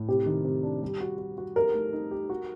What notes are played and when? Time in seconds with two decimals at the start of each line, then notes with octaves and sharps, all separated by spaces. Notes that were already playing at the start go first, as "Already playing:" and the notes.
Already playing: A2
0.08 C3 G4
0.26 D#3
0.45 C3
0.63 D4
0.82 G3
1.01 F#4
1.18 F#4
1.38 F#4
1.56 G4 A#4
1.74 A3
1.93 D#4
2.11 G4
2.30 F#4